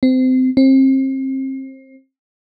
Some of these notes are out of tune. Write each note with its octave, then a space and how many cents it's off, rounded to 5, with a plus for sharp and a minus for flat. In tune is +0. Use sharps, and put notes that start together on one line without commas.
C4 -25
C4 +30